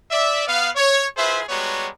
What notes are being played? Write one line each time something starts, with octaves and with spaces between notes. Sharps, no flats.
D5 E5
B3 F5
C#5
E4 F4 G#4 B4 C5 E5
G3 G#3 B3 F#4 C#5 A#5